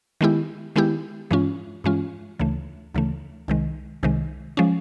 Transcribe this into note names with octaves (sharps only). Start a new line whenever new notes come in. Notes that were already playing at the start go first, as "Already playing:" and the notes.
D#3 G#3 B3 E4 G4
D#3 G#3 B3 E4 G4
G2 E3 G#3 C#4 F4
G2 E3 G#3 C#4 F4
D2 C#3 E3 A3
D2 C#3 E3 A3
C2 C3 D#3 G#3
C2 C3 D#3 G#3
F3 G#3 C#4